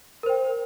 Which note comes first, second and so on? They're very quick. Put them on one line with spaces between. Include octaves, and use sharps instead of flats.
A#4 C5 G5